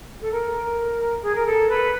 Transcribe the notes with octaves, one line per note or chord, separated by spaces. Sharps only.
A4
A#4
G#4
A#4
A4
B4